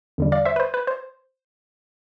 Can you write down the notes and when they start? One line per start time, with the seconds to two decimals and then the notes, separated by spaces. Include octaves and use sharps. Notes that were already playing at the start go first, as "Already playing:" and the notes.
0.18 E2 D3 G3
0.32 D5 F5
0.45 C5 E5
0.56 B4
0.60 C5
0.74 B4
0.87 C5